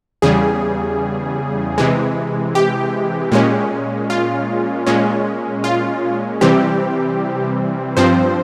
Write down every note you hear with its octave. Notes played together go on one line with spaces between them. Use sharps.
E2 C#3 G3 G#4
C3 E3 G#3
G4
A#2 G#3 C#4
F4
A#2 G#3 C#4
F4
C3 E3 G3 C4 G4
G2 F3 C4 C5